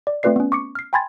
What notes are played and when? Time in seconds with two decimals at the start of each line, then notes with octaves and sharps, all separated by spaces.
0.07 D5
0.23 A3 C4 F4 B4 D5 C7
0.36 B3 C#4
0.52 C#6 D6 C#7
0.75 F6 C7
0.93 G5 G#5 B5 C6 G#6 A6